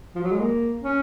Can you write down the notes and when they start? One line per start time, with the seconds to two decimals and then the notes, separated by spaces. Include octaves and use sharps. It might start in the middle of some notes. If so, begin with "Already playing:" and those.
0.15 F3
0.23 F#3
0.32 G#3
0.40 A#3
0.82 C#4